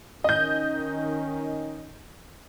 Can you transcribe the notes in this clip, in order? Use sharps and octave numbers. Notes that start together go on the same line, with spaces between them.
D#3 C#4 D#5 G6